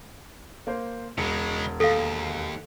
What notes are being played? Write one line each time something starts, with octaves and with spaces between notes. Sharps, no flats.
A#3 C5
E1 C#3 G#3
D#2 A4 F5